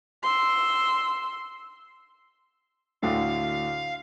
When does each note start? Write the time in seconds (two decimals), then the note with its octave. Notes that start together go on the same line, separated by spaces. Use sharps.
0.23 C6 E6
3.03 D2 A2 D3 F5